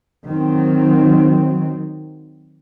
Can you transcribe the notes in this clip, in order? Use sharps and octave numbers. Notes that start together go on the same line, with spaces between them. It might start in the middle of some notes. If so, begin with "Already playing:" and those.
D#3 F#3 C4